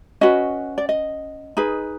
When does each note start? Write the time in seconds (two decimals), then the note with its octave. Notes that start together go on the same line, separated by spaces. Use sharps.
0.21 C#4 F#4 B4 D#5
0.78 D5
0.89 D#5
1.57 D#4 G#4 B4